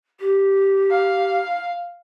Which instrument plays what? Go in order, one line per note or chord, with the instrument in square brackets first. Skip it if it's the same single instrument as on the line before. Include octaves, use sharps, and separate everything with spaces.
[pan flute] G4
[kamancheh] F5